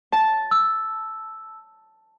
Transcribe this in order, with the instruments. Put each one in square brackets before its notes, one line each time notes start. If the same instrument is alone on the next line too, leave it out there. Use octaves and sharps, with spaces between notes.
[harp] A5
[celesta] E6